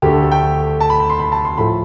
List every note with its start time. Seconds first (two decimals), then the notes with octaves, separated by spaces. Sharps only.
0.02 D2 D3 A3 G4
0.13 A4
0.23 A4
0.31 G5
0.80 A5
0.90 B5
1.00 B5
1.10 C6
1.20 B5
1.32 A5
1.45 C6
1.58 A2 F3 A3 B5